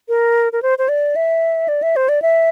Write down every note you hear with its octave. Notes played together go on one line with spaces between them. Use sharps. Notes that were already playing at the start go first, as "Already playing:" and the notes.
A#4
A#4
C5
C5
D5
E5
D5
E5
C5
D5
E5